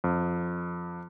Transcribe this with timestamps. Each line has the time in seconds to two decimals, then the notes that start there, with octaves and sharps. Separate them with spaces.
0.04 F2